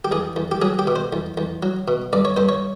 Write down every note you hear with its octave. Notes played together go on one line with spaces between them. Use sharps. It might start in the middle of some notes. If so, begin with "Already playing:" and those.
G4
E2 G#4
E2
G4
F#3 G#4
G4
B2
C5
E2
E2
F#3
B2
G2 D5
C#5
G2 C5
C#5